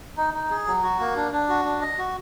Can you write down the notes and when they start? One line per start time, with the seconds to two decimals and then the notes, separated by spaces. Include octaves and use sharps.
0.18 D#4
0.34 D#4
0.50 G#4
0.67 F#3
0.83 F#4
0.99 A#3
1.16 D4
1.32 D4
1.49 F#4
1.65 D4
1.81 D#5
1.98 F#4